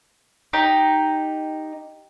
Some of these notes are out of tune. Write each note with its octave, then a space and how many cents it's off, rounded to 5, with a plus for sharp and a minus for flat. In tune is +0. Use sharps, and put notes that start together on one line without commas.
D#4 +0 G4 +0